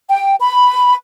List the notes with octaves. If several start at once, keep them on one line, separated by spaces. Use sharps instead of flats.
G5
B5